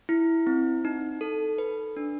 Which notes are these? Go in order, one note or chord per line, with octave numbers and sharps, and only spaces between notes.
E4
C4
D#4
A4
B4
D4